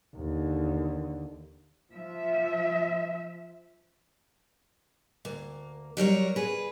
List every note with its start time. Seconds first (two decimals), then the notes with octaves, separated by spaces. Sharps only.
0.16 D#2 D3
1.93 F3 E5
5.25 D2 A#3
5.97 F#3 G3 A#4 C#5
6.36 G#4 B4